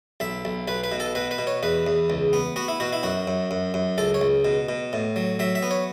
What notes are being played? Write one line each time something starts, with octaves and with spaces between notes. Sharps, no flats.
B1 E5
B1
B1 B4
B4
B2
A4
B2 B4
B4
B2
C#5
E2 B4
E2
C#2
B3
B3 F#4
E4
B2 F#4
E4
F#2 F#4
F#2
F#2
F#2
C#2 A4
C#5
C#2
B2
B2
A2
F#3
F#3 E5
E5
B3
C#5